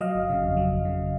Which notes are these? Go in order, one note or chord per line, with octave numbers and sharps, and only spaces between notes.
F#3 D#5 F5
G1
C#3
F2
F#3
G1
C#3